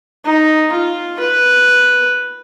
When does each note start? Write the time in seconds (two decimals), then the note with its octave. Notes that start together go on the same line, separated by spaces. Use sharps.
0.25 D#4
0.72 F4
1.20 B4